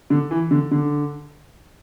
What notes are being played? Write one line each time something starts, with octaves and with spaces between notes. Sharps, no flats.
D3
E3
D3
D3